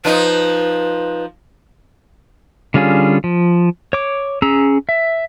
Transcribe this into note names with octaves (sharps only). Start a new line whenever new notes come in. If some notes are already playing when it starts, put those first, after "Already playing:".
F3 D#4 B4
D3 G3 C#4 F4 G#4
F3
C#5 D6
C#4 G#4 A#5 E6
E5